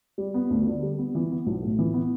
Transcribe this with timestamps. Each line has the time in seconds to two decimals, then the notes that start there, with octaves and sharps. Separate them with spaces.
0.18 G3
0.34 B3
0.50 D2
0.66 D3
0.83 G3
0.98 B3
1.15 E3
1.31 B3
1.46 B1
1.63 A2
1.79 E3
1.94 B3